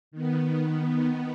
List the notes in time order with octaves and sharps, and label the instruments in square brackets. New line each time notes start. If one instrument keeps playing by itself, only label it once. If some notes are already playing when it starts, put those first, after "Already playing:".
[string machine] D#3 B3